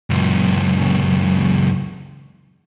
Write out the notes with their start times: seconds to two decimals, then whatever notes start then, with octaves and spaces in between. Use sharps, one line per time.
0.10 C#2 F#2